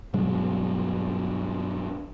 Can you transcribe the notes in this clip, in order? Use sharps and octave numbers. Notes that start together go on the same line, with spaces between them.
G2 B2 F#3 G#3